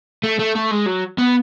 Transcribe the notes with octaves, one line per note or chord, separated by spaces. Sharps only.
A3
A3
A3
G#3
F#3
B3